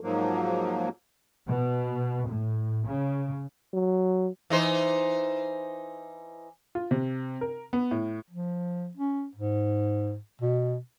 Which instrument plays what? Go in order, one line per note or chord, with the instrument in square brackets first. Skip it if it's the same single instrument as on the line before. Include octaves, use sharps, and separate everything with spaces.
[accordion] G#2 F3 F#3 A#3
[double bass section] B2
A2
C#3
[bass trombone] F#3
[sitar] E3 D#4 C5
[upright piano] F4
C3
A#4
B3
A2
[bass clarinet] F3
C#4
G#2
B2